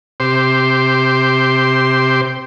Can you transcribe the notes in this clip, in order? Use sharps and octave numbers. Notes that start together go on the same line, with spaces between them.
C3 G4 C5 C6 D6